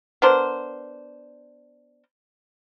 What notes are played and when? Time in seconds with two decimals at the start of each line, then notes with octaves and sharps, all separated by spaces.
0.22 B3 D4 A#4 C5